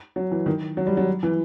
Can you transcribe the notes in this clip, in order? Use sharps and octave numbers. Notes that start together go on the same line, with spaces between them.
F#3
E3
D#3
F#3
G3
F#3
E3